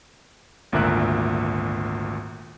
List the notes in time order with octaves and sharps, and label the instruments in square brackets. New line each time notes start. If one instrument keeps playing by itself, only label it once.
[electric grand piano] G#1 D2 A#2 A#4 E5 F#6